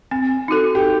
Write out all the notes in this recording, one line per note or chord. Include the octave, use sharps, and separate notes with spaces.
C4
D#4 F#4 A4
G4